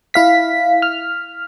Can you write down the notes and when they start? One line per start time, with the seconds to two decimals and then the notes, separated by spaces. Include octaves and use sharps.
0.14 E4 F5 B6
0.82 F6